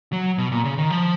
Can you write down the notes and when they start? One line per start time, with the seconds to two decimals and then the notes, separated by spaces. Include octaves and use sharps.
0.12 F#3
0.38 B2
0.52 A#2
0.65 C#3
0.78 D#3
0.90 F3